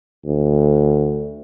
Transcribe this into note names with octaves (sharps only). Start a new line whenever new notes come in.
D2